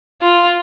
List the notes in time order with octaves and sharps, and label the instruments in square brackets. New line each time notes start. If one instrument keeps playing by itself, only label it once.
[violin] F4